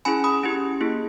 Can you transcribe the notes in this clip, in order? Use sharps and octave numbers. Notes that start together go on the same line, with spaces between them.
C#4 E4 G#4 G#5 B5
B5 D#6
C#4 E4 G4
A#3 E4 G#4